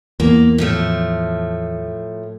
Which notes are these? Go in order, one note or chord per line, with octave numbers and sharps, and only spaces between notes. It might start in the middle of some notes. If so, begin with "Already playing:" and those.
E2 A#3
A2 F3 A3